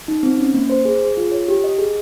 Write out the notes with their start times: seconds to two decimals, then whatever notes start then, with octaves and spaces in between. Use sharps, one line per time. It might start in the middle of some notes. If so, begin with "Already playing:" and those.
0.08 D#4
0.23 C4
0.38 C#4
0.54 A#3
0.70 C5
0.85 G#4
1.01 G#4
1.17 F4
1.32 C#5
1.48 G4
1.64 D#5
1.78 G#4